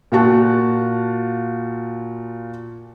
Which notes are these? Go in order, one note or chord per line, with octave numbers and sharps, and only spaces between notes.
A#2 F4 F#4 A5 F#6